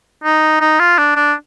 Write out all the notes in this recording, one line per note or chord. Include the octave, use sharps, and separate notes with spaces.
D#4
D#4
F4
D4
D4